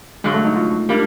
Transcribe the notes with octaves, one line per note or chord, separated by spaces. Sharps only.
G2 D3 F#3 G#3
A3
D#4
F4
G3 A#3 D4